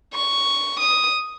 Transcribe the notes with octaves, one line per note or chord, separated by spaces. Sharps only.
C#6
D#6